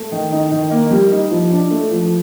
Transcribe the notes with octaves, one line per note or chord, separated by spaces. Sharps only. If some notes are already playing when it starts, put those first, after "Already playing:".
Already playing: A3
D#3
D#4
D#3
A#3
G3
D#4
F3
D4
A3
F3